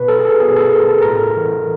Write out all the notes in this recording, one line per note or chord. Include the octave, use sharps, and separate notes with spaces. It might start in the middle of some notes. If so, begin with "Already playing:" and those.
Already playing: B2 B4
A4
G#4
A4
B2 G#4
A4
A#4
A4
A2 A#4
A4
E3